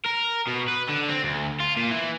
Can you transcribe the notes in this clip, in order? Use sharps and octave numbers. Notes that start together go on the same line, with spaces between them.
A#4
B2
B4
D3
C4
D2
F4
A#2
E3